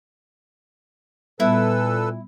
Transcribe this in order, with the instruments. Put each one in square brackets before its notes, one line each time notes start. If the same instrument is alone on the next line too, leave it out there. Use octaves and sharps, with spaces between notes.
[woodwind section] A#2 [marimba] G3 B3 [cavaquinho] E4 [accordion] A4 B4 E6